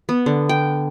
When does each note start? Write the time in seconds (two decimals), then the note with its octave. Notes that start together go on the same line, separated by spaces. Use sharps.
0.09 B3
0.26 D3
0.49 G5